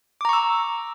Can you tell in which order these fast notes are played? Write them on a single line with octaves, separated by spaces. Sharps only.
D6 A#5 C#6 E6